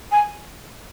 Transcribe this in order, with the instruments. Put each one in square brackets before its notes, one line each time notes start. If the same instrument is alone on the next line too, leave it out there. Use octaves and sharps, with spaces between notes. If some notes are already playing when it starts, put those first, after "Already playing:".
[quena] G#5